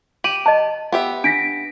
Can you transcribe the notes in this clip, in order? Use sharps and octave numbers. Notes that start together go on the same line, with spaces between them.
G4 D#7 F#7
D#5 A5
B3 G4 E5
D4 A#6 B6 D7